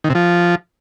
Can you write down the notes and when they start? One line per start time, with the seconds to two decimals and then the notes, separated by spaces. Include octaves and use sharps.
0.04 D#3
0.10 C3
0.15 F3